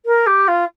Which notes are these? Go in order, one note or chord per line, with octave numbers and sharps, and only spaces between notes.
A#4
G4
F4